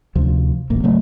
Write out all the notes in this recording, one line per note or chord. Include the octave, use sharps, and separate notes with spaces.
D2 C3 F3
D1 A1 A#3
C#3 F#3 A3